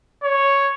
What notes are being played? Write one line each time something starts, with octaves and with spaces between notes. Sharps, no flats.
C#5